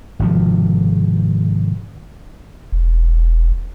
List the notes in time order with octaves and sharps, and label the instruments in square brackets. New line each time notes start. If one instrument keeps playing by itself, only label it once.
[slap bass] G#1 C3 F3
[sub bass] E1